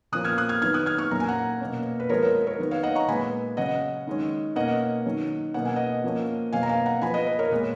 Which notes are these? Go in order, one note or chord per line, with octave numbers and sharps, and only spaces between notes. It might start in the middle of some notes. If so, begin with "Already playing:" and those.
A#2 F3 A#3 C#4 D#6 F#6
F6 G#6
D#6 F#6
F6 G#6
D#3 F#3 B3 F6 G#6
D#6 F#6
F6 G#6
C#6 F6
A#2 F#3 A#3 C#4 A#5
G#5
F#5 A#5
B2 A#3 C#4
B4
F3 G#3 B3 A#4 C#5
A#4 C#5
B4
A#4 C#5
D#3 F#3 B3
C#5 F5
D#5 F#5
A#5 C#6
A#2 G#3 B3 G#5 B5
C#3 F#3 C#4 D#5 F#5
D#3 G#3 C#4
B2 A#3 C#4 D#5 F#5
D#3 F#3 C#4
B2 A#3 C#4 F#5
G#5
D#5 F#5
F3 A#3 C#4
B2 F#3 A#3 F5 G#5
A#5
F5 G#5
F#5 A#5
F3 B3 G#5 B5
B4 D#5
B4
A#4 C#5
A#2 G#3 B3 B4